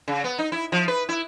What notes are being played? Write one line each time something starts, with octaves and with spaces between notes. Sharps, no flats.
C#3
B3
D#4
E4
F3
B4
E4